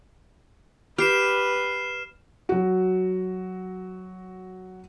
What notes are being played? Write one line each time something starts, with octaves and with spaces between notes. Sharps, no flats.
G4 B4 F6 C7 E7
F#3 F#4